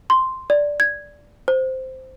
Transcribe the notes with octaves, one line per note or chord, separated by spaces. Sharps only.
C6
D5
G#6
C5